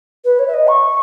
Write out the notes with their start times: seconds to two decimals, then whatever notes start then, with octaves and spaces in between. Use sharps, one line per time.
0.24 B4
0.39 C#5
0.47 E5
0.53 D#5
0.67 C#6